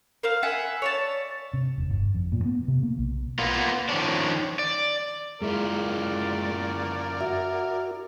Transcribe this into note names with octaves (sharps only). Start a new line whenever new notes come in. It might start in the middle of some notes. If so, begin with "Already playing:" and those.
A#4 C5 F5
E5 F#5 G#5 B5
C#5 D5 A5
C3
E1
G1
F2
A#2
B3
C3
A#3
B1
A#3 B3 F4
D#3 F3 C#4 D4
D5
F#2 G#3 E4 F4 A#4 D5
F#4 E5